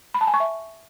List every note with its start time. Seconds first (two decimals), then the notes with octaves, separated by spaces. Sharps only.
0.14 B5
0.21 A5
0.27 G#5
0.34 C#6
0.40 E5